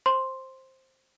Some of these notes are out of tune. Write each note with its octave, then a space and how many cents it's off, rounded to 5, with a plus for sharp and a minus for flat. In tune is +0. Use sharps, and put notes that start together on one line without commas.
C5 +10 C6 +0